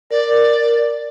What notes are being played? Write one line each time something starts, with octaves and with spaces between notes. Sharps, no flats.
A#4 D5